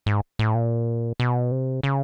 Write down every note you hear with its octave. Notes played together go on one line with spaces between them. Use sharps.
G#2
A2
A#2
B2
C3
C#3